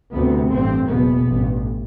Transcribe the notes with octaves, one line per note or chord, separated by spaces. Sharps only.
D2 C3 B3
A1 G2 C4
F#1 E2 B2 B3
A1 G2